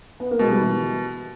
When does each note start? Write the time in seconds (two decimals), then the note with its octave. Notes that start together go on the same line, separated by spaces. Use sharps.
0.20 B3
0.31 A#3
0.39 B2 G#3
0.50 G3
0.61 E3